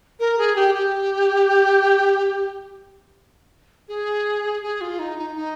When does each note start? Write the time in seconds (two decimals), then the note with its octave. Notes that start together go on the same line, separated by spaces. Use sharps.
0.20 A#4
0.38 G#4
0.56 G4
0.75 G4
3.88 G#4
4.63 G#4
4.81 F4
4.99 D#4
5.18 D#4
5.36 D#4